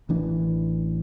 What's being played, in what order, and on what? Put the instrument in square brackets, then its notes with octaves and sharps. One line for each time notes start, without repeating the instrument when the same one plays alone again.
[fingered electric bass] A1 E3 D4